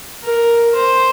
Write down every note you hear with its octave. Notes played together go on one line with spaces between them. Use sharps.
A#4
C5